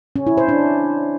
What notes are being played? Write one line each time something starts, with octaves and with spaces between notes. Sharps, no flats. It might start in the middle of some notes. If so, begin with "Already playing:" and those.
C#4
E4
C5
D4